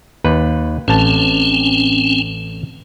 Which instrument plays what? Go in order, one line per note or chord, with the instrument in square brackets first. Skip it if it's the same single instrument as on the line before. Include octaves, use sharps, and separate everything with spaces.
[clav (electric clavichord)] D#2 B4
[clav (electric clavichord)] A1 A5 [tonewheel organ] C4 C#4